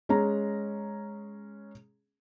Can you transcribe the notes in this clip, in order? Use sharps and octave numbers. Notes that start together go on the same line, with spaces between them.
G#3 C#4 G#4 A#5